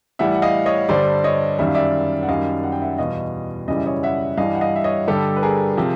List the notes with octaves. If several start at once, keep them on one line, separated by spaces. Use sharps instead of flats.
A2 E3 G3 E5 F#5
F#5
D#5 F5
C#5 D#5
G2 D3 G3 C5 D5
C#5 D#5
F#2 D#3 G3 E5
F5
D5 E5
F#5
F#2 D#3 G3 D#5 F5
F#5
G5
E5 F#5
E2 B2 G3 D#5 F5
F#2 C#3 E3 G3 D#5
E5
C#5 D#5
E5 F#5
G2 E3 G3 D#5 F5
F#5
D#5 F5
E5
C#5 D#5
G2 D3 G3 G4 A4
B4
G#4 A#4
C3 F3